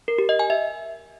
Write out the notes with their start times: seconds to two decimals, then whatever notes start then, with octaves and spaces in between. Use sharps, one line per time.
0.08 A#4
0.18 G4
0.29 D#5
0.39 G#5
0.50 E5